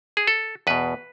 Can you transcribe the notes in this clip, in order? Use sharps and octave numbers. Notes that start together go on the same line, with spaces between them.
G#4
A4
E2 B2 B4